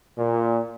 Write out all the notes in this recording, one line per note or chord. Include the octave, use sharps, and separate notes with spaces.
A#2